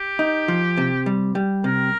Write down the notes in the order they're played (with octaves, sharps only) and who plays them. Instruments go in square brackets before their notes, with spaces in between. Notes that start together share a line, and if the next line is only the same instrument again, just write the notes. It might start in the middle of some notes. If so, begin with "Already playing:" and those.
Already playing: [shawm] G4
[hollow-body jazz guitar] D#4
F3
C3
G3
G3
[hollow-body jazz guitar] C3 [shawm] A#4